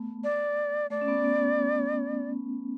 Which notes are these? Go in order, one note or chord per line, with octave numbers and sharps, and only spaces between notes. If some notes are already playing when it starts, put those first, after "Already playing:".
Already playing: A3 B3
D5
A3 D5
C#4
B3
B3